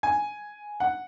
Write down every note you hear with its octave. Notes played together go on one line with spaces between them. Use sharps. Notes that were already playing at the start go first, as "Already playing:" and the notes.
G#5
F#5